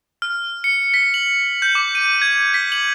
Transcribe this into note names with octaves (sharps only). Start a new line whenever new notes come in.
F6
C#7
B6
F#7
G6
D6
D#7
G#6
B6
F#7